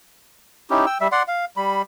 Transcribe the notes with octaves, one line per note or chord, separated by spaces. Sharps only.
C#4 D#4 E4 G4
G5 E6
G3 E5
D5 F#5 C6
F5
G3 B5